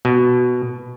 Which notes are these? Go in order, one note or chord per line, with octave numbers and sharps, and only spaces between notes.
B2